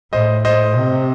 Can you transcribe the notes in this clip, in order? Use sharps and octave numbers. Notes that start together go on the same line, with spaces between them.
A2 C5 D#5
C5 D#5
C3